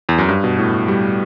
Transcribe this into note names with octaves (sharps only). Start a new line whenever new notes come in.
E2
F#2
G2
B2
A2
G3